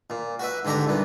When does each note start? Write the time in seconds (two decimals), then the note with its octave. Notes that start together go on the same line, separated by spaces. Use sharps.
0.10 A#2
0.39 F#4 B4 E5
0.65 G#2 D3 G4 E5 A#5
0.86 C2 A#2 B3